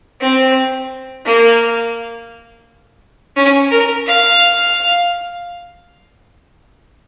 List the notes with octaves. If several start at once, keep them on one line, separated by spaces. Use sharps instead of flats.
C4
A#3
C#4
A#4
F5